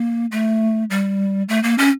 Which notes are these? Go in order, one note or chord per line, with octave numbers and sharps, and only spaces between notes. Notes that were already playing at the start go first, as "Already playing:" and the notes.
Already playing: A#3
A3
G3
A3
A#3
C#4